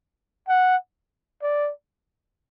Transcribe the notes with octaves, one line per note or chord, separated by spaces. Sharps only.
F#5
D5